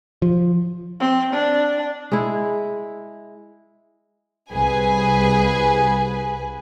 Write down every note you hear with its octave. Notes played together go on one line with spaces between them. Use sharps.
F3
C4
D4
G#3 E4
C2 G#4 B4 G#5